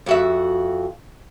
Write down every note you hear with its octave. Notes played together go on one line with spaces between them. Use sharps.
F2 F#4 E5